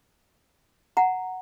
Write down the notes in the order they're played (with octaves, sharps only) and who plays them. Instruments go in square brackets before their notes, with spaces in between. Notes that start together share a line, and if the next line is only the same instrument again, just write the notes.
[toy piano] F#5 A#5